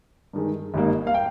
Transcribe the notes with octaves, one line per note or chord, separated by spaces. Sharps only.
G2 D#3 G#3
G#1 G#2 G3 A#3
F5
G5